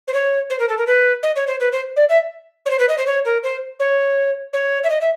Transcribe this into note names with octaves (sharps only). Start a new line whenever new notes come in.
C5
C#5
C5
A#4
A4
A#4
B4
D#5
C#5
C5
B4
C5
D5
E5
C#5
C5
B4
D#5
C5
C#5
A#4
C5
C#5
C#5
E5
D#5
E5